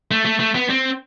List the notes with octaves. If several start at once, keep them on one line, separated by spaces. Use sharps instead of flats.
A3
A3
A3
B3
C4